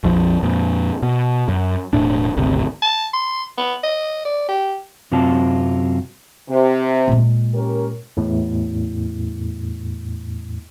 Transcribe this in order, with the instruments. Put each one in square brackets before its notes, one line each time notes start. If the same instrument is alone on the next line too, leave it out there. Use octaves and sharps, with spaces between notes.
[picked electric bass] A#1 F2 F3
F2 A#2
B2
F#2
E1 A2 D4
G#1 D2 C3
[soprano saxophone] A5
C6
B3
D#5
D5
G4
[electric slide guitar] F#2 C3 F#3 C4 F4 A5
[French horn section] C3
[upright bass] A#2 G#3
[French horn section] C#4 G4 A#4
[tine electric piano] E2 A2